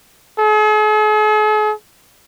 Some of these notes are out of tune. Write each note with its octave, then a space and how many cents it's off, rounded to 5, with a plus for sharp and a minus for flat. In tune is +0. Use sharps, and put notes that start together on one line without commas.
G#4 +45